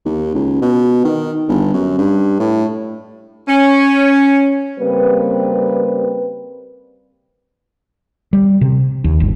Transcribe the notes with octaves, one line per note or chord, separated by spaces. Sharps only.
D#2
C#2
B2
D#3
G1
F#2
G2
A2
C#4
C#3 G3 A#3 C4 B4
G3
C3
D#2
G1